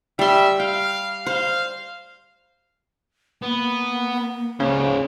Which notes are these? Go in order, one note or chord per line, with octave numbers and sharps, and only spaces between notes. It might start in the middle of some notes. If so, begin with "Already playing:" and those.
G3 E5 C6
F5 G5
C5 F5
A#3 B3
C#2 C#3 C5